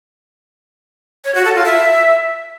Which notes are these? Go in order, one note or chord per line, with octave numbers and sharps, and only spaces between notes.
C#5
F#4
A4
F4
E5